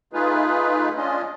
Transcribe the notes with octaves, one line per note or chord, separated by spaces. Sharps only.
A3 D#4 F4 G#4 B4
C#4 D4 F4 D#5